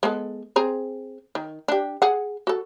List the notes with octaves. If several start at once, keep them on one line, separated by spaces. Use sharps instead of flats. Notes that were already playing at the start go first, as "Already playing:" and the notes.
G#3 B3 A4
C4 G#4 A#5
D#3
D4 G4
G#4 F#5
F#4 A4